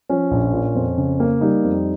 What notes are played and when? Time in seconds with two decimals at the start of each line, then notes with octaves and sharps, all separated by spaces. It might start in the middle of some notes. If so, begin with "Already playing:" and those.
0.10 F3 C#4
0.31 A#1
0.53 A#2
0.75 F2
0.98 C#3
1.20 A#3
1.41 G3 D#4
1.64 F2